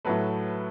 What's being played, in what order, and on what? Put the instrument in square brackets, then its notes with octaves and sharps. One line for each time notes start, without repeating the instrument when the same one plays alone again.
[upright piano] A2 F#3 A3 B4